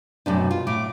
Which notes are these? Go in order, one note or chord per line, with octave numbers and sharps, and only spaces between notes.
F#2 A2 C3 D4
B2
F4
A2 D6